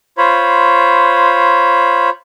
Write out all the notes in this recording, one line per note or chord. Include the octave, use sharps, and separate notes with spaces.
F4 C5 C#5 B5